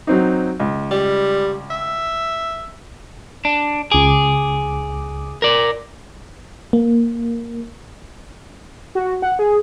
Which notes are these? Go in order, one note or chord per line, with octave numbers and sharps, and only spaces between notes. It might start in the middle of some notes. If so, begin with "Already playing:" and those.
F#3 C4 D#4
C#2
G3
E5
D4
C#2 G#4 D6
A#4 D5
A#3
F#4
F#5
G#4